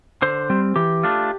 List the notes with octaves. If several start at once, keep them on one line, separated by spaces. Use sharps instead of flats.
D3 C5
G3 C4
E3 G4
A3 D4 F4